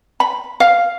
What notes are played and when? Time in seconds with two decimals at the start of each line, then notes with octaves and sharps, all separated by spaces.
0.20 B5
0.60 F5